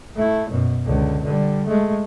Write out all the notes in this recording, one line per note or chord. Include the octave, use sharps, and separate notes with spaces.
A3 E4
F#2 B2
C#2 D3
D3 G3
G#3 A3